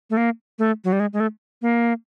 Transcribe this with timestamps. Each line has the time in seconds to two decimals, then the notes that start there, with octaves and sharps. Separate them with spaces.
0.10 A3
0.17 A#3
0.59 A3
0.84 F#3
0.93 G3
1.00 G#3
1.13 G#3
1.20 A3
1.62 A#3